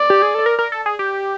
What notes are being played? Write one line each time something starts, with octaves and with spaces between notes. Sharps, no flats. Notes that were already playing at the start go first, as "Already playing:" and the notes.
Already playing: D5
G4
G#4
A4
A#4
A#4
A4
G#4
G4